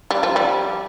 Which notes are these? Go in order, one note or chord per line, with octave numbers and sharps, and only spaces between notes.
G3
F3
G3